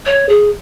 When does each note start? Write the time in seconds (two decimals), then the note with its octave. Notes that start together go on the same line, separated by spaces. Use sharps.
0.05 C#5
0.29 G#4